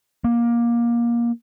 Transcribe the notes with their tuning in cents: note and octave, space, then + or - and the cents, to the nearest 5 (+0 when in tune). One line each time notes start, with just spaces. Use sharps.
A#3 +20